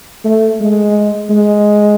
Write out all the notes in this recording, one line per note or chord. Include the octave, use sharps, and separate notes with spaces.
A3
G#3
G#3